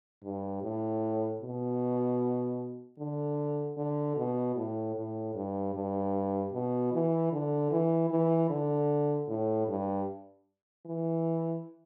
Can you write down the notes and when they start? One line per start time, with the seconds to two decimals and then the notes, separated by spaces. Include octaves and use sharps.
0.23 G2
0.62 A2
1.41 B2
2.99 D3
3.77 D3
4.17 B2
4.56 A2
4.96 A2
5.35 G2
5.74 G2
6.53 B2
6.92 E3
7.32 D3
7.71 E3
8.10 E3
8.50 D3
9.28 A2
9.67 G2
10.86 E3